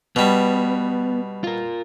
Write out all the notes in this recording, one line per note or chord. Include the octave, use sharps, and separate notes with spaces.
B2 G3 B3
F4 A#4